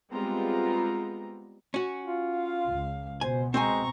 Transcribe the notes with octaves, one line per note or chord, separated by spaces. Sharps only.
G3 G#3 B3 C4 F4 A#5
C#4 F#4
F4
F5
C#2
B2 C5 G#5
G#3 C4 C5 G#5 A#5 C#6